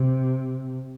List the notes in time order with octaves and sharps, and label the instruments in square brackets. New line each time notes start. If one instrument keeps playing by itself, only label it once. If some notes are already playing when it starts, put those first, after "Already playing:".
Already playing: [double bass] C3